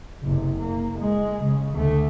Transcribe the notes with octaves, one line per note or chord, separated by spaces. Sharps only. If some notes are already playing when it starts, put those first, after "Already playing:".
F#1 C3
A#3
G#3
C#3
D2 A3